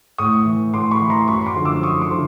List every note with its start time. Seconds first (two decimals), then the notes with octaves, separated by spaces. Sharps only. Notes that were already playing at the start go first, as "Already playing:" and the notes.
0.18 A2 C#6 D#6
0.46 E3
0.74 A2 C6 D6
0.91 B5 C#6
1.01 E3
1.10 A#5 C6
1.28 F#2 B5 C#6
1.46 C6 D6
1.56 D3 F3
1.65 D6 E6
1.83 F#2 C#6 D#6
2.01 C6 D6
2.11 D3 F3